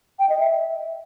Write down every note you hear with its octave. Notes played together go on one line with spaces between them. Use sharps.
G5
D#5
E5